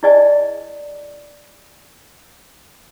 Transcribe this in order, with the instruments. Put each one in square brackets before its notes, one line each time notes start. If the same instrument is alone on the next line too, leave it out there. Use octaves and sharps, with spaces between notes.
[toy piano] E4 G#4 D5 D#5 G#5 A5